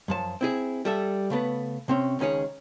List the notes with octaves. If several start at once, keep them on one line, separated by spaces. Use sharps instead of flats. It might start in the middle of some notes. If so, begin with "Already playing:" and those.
F#2 F3 A5
C4 E4 G#4
G3 A4 E5
C#3 A3 B3 B4
C3 C4 C#4
C#2 D#3 C#4 G#4 C#5